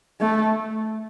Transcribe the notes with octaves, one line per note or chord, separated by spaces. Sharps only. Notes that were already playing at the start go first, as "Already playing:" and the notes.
A3